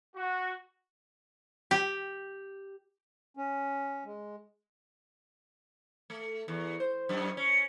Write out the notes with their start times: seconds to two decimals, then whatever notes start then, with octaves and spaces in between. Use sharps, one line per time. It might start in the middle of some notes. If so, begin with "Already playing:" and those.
0.14 F#4
1.71 G4
3.37 C#4
4.05 G#3
6.10 A3
6.48 E2
6.80 C5
7.09 F#2
7.37 C#4